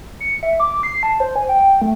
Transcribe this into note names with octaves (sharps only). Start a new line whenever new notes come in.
C#7
E5
D6
C7
A5
C5
G#5
G5
A3